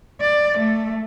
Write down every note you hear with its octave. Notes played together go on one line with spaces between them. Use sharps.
D5
A3